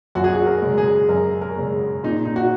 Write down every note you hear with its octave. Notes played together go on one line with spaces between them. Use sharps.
F#2 F#4
G#4
F#4
A#4
C#3 G#3
G#4
F#2 A#4
A#4
C#3 G#3
A#2 D#4
D#4
F#4